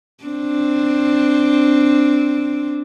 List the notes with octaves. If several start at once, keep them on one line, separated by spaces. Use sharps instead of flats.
C4 D4